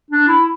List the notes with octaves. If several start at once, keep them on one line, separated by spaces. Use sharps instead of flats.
D4
E4